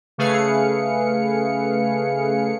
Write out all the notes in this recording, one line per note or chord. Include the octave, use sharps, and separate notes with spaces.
C#3 A3 G#4 B4 F5 C#7